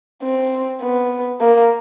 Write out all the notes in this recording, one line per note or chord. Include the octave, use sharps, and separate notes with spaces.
C4
B3
A#3